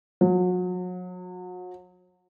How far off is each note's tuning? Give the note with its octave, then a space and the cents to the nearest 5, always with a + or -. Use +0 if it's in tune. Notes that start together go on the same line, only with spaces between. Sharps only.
F#3 -35